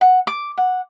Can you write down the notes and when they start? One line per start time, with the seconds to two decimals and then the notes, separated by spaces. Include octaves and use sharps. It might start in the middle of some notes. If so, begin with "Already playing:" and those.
0.01 F#5
0.27 D6
0.58 F#5